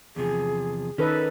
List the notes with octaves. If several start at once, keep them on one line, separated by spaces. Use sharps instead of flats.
E2 C3 F3 G#4
D#3 C#4 D#4 A4 B4